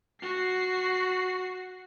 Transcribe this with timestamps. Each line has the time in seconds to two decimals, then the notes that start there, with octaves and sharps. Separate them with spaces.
0.22 F#4 C7